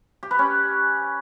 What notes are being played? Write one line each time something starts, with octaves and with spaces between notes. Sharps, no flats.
G4
B4
C#4